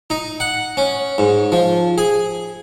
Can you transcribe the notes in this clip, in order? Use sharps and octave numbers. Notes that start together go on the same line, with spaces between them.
D#4
F#5
C#4
G#2
F3
G#4